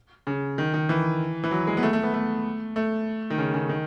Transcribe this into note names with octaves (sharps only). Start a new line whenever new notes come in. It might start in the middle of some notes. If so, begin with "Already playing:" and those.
C#3
D#3
D#3
E3
E3
F#3
G#3
B3
A3
A3
B3
A3
A3
D#3
C#3
C#3
D#3